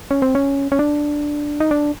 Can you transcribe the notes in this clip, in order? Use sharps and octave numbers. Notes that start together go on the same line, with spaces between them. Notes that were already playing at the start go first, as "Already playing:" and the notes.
C#4
C4
C#4
C#4
D4
D#4
D4